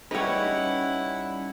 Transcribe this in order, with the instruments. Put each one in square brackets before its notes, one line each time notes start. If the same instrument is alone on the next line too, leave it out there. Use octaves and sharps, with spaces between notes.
[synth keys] G3 C#4 [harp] D#4 G4 [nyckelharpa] E4 F#5 [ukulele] B4 C#5